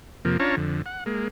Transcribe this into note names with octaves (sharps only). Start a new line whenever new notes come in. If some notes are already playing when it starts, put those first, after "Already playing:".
F2 C3 F3 A#3
C#4 D4 F4 C#5 A5 A#5
F2 D3
F#5
G#3 A#3